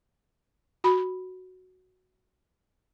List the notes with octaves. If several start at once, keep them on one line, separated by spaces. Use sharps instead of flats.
F#4 B5